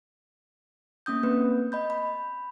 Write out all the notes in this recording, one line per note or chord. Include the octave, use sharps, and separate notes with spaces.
A#3 C#4 D#6 G6
A3 A#3 C4 B4
D#5 B5 G6
B5